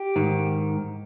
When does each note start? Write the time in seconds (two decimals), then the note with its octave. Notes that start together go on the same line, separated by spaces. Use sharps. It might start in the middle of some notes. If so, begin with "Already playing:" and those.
Already playing: G4
0.16 G#2 D#3